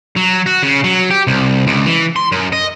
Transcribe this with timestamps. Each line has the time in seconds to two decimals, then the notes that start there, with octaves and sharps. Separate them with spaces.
0.17 F#3
0.46 F#4
0.63 C#3
0.84 F#3
1.10 G4
1.27 C2
1.67 C#2
1.86 E3
2.16 C6
2.32 F#2
2.52 D#5